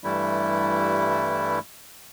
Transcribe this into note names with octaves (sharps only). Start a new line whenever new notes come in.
G2 E3 G3 A3 E4